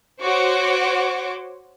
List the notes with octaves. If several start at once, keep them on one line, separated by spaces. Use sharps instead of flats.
F#4 C5 C#5 C#6 D6